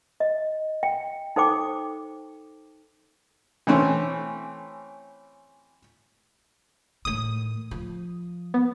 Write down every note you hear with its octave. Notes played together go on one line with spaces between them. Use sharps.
D#5
G5
D#4 A4 C5 G5 D6
E3 A3 C4 C#4
A2 D#3 D#6
F3
B3